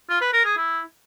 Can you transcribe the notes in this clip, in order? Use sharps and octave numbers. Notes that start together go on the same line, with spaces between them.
F4
B4
A#4
G#4
E4